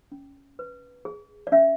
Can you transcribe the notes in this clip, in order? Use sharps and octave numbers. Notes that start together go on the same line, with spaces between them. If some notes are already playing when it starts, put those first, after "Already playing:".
C#4
B4
G#4
D5
C#4 E5